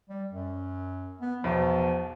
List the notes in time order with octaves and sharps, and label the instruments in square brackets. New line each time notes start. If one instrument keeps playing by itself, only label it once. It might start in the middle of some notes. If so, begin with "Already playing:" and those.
[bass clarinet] G3
F#2
B3
[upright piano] B1 E2 B2 [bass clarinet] F3